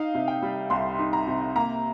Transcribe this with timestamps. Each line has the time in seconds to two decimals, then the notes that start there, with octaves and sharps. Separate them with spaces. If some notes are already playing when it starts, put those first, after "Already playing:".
Already playing: D#4 F5
0.14 C3
0.28 G5
0.42 G3
0.70 C2 C6
0.99 D#4
1.13 A#5
1.27 C3
1.56 A#3 A#5